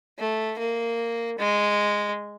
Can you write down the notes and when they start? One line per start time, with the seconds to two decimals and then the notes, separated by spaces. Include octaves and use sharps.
0.19 A3
0.59 A#3
1.39 G#3